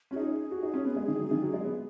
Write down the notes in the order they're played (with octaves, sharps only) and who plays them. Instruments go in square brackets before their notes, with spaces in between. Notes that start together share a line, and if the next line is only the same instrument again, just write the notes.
[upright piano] C#4 [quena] F#4
[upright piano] D#4 [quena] G#4
[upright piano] F#4
D#4
C#4
B3
G#3
D#3
F#3
D#3
F#3
G#3
B3